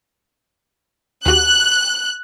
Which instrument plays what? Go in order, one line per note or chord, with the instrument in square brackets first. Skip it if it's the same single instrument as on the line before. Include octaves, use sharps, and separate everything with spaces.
[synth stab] D#2 F#4 G4 [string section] F#6